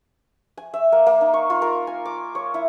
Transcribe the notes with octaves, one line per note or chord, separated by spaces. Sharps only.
G#5
E5
A#3
A#3
D#4
C#6
F4
A#4
G#5
D6
C#5
E4